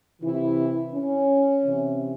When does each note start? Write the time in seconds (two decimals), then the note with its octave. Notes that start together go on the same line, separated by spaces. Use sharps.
0.22 C3 E3 E4
0.92 C#4
1.64 C3 E3